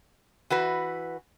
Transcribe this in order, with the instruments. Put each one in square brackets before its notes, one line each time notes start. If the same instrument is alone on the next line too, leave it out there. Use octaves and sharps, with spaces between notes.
[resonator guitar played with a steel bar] E3 F#4 B4